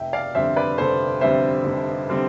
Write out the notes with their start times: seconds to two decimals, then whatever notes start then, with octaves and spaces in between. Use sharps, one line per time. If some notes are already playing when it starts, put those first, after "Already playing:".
Already playing: F1 E5 G5
0.13 D5 F5
0.35 F2 D3 G3 C4 C5 E5
0.56 B4 D5
0.78 F1 A4 C5
1.21 F2 D3 G3 C4 C5 E5
1.65 F1
2.09 D3 G3 C4